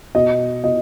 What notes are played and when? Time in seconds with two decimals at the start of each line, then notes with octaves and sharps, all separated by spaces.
0.15 B2 D#5
0.64 B2 D#5